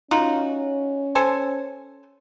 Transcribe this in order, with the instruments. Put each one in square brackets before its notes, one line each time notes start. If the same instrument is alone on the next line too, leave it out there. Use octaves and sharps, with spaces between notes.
[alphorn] C#4 [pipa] D#4 F4 F#4
[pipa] A4 C5 G#5